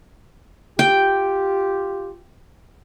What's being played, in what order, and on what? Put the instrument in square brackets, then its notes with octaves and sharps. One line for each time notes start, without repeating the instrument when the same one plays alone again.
[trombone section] F4 G4 [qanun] G5